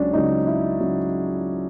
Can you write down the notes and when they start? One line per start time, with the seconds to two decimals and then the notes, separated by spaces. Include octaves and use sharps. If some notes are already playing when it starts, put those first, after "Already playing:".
Already playing: C#2 C#3 F#3 C#4 D4
0.13 C#2 C#3 F#3 D#4
0.47 E4
0.80 C#3 F#3